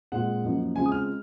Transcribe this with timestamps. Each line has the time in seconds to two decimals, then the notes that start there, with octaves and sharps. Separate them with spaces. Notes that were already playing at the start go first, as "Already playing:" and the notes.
0.12 A#2 G#3 C4 F4 F#5
0.44 F#2 F3 A#3 D#4
0.76 C#3 G#3 C4 F4 G#5
0.86 D#6
0.92 F6